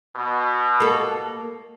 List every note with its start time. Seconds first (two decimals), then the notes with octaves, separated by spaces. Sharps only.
0.16 B2
0.80 A#3 A4